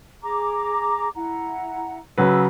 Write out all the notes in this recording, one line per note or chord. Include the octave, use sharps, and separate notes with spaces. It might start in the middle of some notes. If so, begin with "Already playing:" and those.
G#4 A#5 D6
E4 F#5 A#5
C#3 F#3 B4 E6